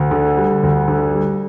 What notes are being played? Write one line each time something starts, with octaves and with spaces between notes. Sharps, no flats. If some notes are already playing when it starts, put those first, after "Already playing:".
Already playing: D2
D3
G3
D2
D3
G3